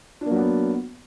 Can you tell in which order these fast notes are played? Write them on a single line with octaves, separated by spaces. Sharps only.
D4 A#3 F#3 B3